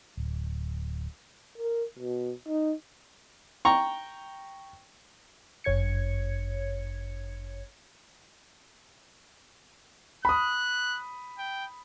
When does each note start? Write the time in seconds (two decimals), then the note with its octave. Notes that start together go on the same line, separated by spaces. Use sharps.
0.17 D1
1.58 A#4
1.99 B2
2.48 D#4
3.65 G5 A#5 C#6
5.64 G1 F#2 C#5 G#6 C#7
10.25 B5 D#6 F#6
11.38 G5